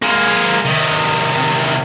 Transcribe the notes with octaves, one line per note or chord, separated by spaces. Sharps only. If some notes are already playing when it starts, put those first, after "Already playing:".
G#3 A#3
C3 D#3